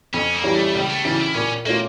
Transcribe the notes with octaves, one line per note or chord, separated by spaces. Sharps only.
F2 C#4
A#3
E3 G3 C#4
A3
C#2 G3
A3
C#3 E3 G3
E4
A#2 C#4
A3 A#3 C#4 F4